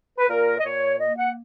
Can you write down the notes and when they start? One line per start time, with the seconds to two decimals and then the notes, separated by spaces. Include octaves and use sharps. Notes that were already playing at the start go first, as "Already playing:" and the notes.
0.19 B4
0.29 A#2 A#4
0.59 D#5
0.64 A#2 C#5
0.99 A#3 D#5
1.17 F#5